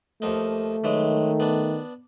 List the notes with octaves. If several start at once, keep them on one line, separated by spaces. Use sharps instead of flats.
D#2 F3 A3 D#4
D#3 E3 F#3 G#3
B3 D4